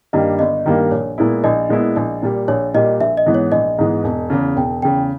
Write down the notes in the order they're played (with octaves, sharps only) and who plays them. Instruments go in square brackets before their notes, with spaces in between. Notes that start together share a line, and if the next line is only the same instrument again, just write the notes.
[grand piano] G2 D#3 G3 A#3 [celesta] D#5
[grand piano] G1 [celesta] D#5
[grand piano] G2 D#3 G3 A#3
[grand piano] A#1 [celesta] C#5
[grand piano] A#2 G#3 B3 E4
[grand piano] A#1 [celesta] D#5
[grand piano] A#2 G#3 B3 E4
A#1
A#2 G3
[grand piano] A#1 [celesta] C#5
[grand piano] A#2 G3 [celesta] D#5
[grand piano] A#1 [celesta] E5
[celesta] D#5
[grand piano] G#2 E3 G#3 B3
[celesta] C#5
[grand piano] A#1 [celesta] D#5
[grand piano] G#2 E3 G#3 B3
E1
E2 C#3
[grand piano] E1 [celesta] G5
[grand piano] E2 C#3 [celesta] G5